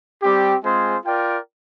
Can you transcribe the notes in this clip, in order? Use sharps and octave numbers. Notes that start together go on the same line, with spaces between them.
G3 C4 G4
G#3 C4 F4 G#4 C5
F4 A#4 D5 G5